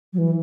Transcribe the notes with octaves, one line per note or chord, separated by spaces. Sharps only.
F#3
E3